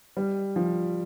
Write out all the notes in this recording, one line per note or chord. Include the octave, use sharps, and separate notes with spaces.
G3
F3